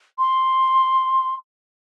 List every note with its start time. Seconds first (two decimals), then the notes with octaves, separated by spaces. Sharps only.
0.19 C6